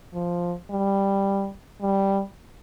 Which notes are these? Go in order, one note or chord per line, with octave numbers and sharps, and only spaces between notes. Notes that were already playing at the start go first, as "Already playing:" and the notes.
F3
G3
G3